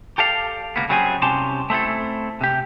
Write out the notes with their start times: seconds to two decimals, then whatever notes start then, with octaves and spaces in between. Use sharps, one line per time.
0.18 G4 A4 D5 F5
0.76 C#2 A#3 B3
0.89 C#3 F#3 G3 C4 F#4 G#4
1.22 C2 C3 C#4 G4 A5 C6
1.70 A3 C4 E4 A4
2.41 C3 G4